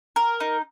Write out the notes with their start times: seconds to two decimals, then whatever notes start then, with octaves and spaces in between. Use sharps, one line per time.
0.16 A#4
0.40 D#4